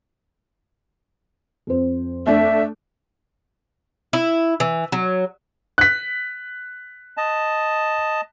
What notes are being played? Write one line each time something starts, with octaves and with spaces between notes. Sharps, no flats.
F2 C5
A3 D4 E5
E4
E3
F#3
F#6 B6
D#5 A5